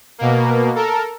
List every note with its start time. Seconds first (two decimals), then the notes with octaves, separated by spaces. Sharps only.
0.18 B2 A#3
0.75 A4 A#4